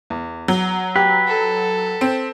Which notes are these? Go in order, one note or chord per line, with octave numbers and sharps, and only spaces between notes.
E2
F#3
G4 B4 G5
A4
C4